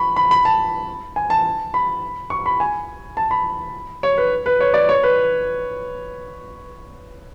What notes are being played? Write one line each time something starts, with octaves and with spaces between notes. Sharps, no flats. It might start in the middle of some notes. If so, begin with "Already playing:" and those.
Already playing: B5 C#6
B5
B5
A5
G#5
A5
B5
C#6
B5
G#5
A5
B5
C#5
B4
B4
C#5
D5
C#5
B4